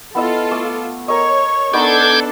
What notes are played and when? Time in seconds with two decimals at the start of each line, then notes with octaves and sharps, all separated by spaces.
0.15 B3 E4 F4 A4 D#5
0.51 A3 D6 D#6
1.08 A#4 C#5 D#5 C#6
1.73 B3 D4 D#4 A4 B4 D6 G6 G#6